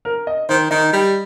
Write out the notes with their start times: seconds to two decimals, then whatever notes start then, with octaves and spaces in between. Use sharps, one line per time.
0.05 A#4
0.27 D#5
0.49 D#3 C5
0.71 D#3 D#5
0.93 G3